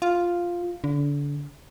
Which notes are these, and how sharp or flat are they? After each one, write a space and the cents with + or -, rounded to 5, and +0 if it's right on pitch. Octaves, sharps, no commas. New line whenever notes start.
F4 +0
D3 -30